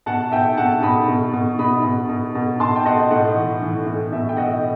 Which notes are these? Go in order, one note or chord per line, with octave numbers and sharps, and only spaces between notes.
B2 F#5 A5
B2 E5 G5
B2 F#5 A5
B2 B5 D#6
B2
B2
B2 B5 D#6
B2
B2
B2
B2 A5 C6
G5
B2 D#5 F#5
A2 D#5 F#5
E3
E3
A2
B2 E5
G5
B2 D#5 F#5